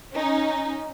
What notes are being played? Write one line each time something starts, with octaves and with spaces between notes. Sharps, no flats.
C#4 D#4